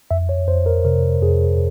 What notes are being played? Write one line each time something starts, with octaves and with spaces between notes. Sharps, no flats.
F2 E5
C#5
F2 C5
A#4
C3 A#4
F2 G#4